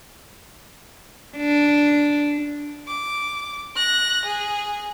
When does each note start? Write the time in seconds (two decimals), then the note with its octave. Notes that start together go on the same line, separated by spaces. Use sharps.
1.37 D4
2.88 D6
3.76 F#6 A#6
4.25 G#4